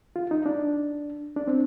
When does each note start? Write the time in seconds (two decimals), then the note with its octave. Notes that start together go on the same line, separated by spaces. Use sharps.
0.16 F4
0.31 D#4
0.46 D4
1.36 D4
1.48 C4